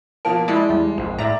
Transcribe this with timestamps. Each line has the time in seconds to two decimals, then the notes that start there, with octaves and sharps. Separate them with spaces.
0.25 B2 F3 A#3 A5 D7
0.48 G#3 E4 D5
0.69 E2 G3
0.98 A#1 F2
1.18 A2 D5 E5 A#5